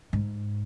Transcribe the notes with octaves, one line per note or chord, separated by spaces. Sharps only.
G#2